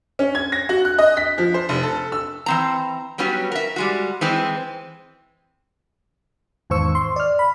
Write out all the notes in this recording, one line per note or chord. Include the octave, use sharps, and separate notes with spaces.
C#4
G#6
A#6
F#4
F#6
D#5
B6
F3
C5
F1
A4
E6
E3 C4 A#5
F#3 G3 B3 C#4 F#4
A#4 E5
G3 G#3 F#4
E3 G#3 C4
E2 G#2 D#3 C5 C#6 E6
C6
D5 F6
B5